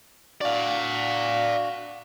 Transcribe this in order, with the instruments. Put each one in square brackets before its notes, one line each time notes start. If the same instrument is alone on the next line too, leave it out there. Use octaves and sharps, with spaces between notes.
[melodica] D4 F#4 [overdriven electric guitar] D5 F5